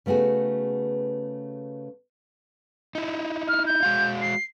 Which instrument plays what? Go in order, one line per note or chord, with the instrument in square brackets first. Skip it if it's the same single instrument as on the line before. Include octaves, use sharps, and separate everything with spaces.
[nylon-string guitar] C#3 A3 B3 F#4 G#4
[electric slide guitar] D#4 E4
[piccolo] F6
G6
[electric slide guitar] G#3 F#4 F5
[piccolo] C7